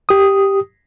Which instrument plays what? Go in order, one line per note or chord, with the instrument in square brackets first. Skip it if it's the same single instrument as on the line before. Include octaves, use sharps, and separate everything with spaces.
[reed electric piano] G4 D#6